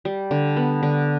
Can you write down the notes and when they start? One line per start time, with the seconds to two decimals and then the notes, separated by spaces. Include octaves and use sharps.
0.05 G3
0.31 D3
0.56 B3
0.83 D3